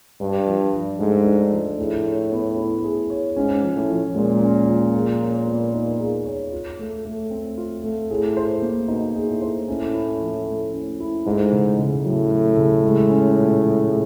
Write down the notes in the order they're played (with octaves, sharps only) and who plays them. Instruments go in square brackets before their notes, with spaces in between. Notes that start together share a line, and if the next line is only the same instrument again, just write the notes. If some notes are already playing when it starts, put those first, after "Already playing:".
[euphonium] G2 [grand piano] D4
[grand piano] F3
F3
[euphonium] G#2 [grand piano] A3
[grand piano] D4
F3
[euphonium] A2 [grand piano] G#4
[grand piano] C#5
B3
E4
G#4
C#5
[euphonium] G#2 [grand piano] C#4
[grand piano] F3
[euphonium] A2
[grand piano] F3
[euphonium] A#2 [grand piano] G#3
[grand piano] C#4
F3
G#4
C#5
B3
D#4
G#4
C#5
F4
A3
A3
C4
F4
A3
[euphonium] A2 [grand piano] G#4
[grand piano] C5
A#3
[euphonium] B2 [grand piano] D#4
[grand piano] G#4
[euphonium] A2
[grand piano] C5
[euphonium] A2 [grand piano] C#4
[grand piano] E4
F3
A3
C#4
E4
[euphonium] G#2 [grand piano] A3
[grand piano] C#3
C#3
[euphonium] A2 [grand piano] F#3
[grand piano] A3
C#3
G#3
C#4
A#2
F3
G#3